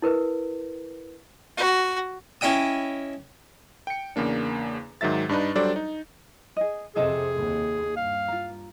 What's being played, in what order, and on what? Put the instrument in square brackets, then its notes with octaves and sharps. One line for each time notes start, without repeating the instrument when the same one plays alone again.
[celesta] E4 A#4 B4
[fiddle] F#4
[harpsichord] C#4 E4 D#5 G5 D#6
[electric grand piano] G5 C#7
E2 C#3 A#3 D4
G#2 D#3 F#3 E5 A6
G2 D4 D#4 B4
F#3 G3 D4 A4 C5 D5
D#4
[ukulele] G#4 D#5
[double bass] F2 C3 [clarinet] G#4 [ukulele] A4 D#5 E5
[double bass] D#2
[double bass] G2 [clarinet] F5
[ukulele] F4 A#5